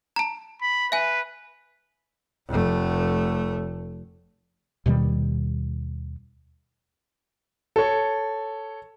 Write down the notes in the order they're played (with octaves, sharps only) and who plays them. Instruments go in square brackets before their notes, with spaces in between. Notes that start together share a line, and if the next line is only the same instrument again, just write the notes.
[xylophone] A5 A#5
[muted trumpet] B5
[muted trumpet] B4 [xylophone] E5 G#5
[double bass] F1 A3
[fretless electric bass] D#2 B2 D#3 G3
[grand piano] A4 C#5